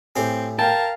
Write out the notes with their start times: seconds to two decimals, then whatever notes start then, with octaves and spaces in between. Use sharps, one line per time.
0.16 A2 C4 G4 G#4
0.58 A#4 F5 G5 A5